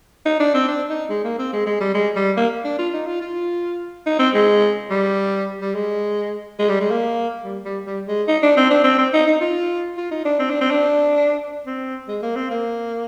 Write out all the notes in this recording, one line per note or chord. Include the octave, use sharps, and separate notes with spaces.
D#4
D4
C4
D4
D#4
G#3
A#3
C4
G#3
G#3
G3
G#3
G3
A#3
D4
F4
D#4
F4
F4
D#4
C4
G#3
G3
G3
G#3
G#3
G3
G#3
A#3
G3
G3
G3
G#3
D#4
D4
C4
D4
C4
C4
D#4
D#4
F4
F4
D#4
D4
C4
D4
C4
D4
C4
G#3
A#3
C4
A#3